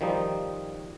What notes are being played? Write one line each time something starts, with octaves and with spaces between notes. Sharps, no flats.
D#3 F3 G3 D#4